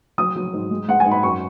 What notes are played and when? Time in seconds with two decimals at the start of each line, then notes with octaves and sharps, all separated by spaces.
0.18 F#3 D#6
0.36 F#3
0.53 G#2
0.71 G#3
0.88 G#3 F#5
1.00 G#5
1.05 G#2
1.11 B5
1.23 F#2 C#6